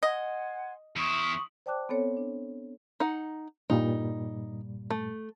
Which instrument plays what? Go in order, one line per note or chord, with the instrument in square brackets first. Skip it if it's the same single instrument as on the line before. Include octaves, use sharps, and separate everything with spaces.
[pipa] D#5 [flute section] F#5 G#5 C6
[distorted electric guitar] E2 E4 [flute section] C6 C#6 D#6
[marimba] C5 D5 G5 A5 D6 F#6
B3 C4 A4 C#5
D4
[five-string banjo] D#4 F#5
[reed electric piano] G2 A#2 G3 [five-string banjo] D#4
[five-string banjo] A3